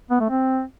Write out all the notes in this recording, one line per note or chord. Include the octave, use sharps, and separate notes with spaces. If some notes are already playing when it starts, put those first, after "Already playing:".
B3
A3
C4